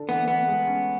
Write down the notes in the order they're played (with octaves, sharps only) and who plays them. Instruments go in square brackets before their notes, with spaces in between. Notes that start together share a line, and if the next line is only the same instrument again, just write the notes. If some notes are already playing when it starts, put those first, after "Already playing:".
Already playing: [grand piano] D3 D4 A4
[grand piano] E3 [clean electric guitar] B3
[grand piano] A3 [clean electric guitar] B3
[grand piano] G#3
C#4